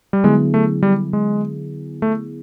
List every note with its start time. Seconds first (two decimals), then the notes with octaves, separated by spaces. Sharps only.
0.13 G3
0.24 D3 F#3 G#3 B3 E4 G#4
0.54 A3
0.83 G3
1.13 G#3
2.02 A3